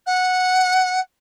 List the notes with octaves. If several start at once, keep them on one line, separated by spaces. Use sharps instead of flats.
F#5